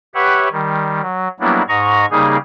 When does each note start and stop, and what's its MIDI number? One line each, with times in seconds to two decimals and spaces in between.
0.15 0.49 67
0.15 0.49 71
0.15 0.49 73
0.15 0.49 76
0.15 0.49 78
0.52 1.01 51
0.52 1.01 55
1.02 1.28 54
1.40 1.62 54
1.40 1.62 55
1.40 1.62 58
1.40 1.62 59
1.40 1.62 62
1.40 1.62 64
1.68 2.06 44
1.68 2.06 75
1.68 2.06 82
1.68 2.06 85
2.11 2.37 49
2.11 2.37 55
2.11 2.37 58
2.11 2.37 63
2.11 2.37 68